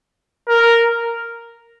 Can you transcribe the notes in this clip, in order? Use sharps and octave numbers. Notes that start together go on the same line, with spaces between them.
A#4